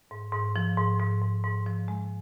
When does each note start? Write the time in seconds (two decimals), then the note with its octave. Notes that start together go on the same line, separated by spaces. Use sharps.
0.11 G#2
0.33 G#2
0.56 F3
0.78 G#2
1.00 G#2
1.22 G#2
1.44 G#2
1.66 F3
1.88 G#3